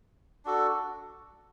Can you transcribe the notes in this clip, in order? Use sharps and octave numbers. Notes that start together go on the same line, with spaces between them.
D4 F#4 A4